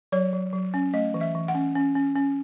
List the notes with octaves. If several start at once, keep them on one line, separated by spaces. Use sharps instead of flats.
F#3 C#5
F#3
F#3
C#4
A3 D#5
E3
E5
E3
F#5
C#4
C#4
C#4
C#4